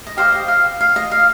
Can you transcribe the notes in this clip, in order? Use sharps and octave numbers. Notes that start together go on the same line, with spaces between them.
D#5
G4 C5 D#5 F5
D#5
F5
F5
D#5
F5